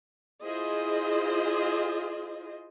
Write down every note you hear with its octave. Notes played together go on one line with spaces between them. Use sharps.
E4 F4 G#4 C5 D#5